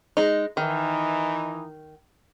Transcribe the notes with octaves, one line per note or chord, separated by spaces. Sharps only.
G#3 D#4
D#3 E3 D#4